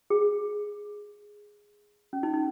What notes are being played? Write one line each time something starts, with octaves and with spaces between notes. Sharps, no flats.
G#4
C#4
D#4
D#4